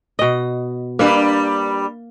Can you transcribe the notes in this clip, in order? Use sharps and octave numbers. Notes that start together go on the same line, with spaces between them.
B2 D#5
G3 A#3 D4 B4 E5